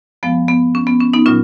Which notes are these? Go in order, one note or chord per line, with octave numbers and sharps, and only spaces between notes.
F#2 F3 G#3 B3
B3
C#4
B3
C#4
B3 D#4
A#2 F#3 C#4 F4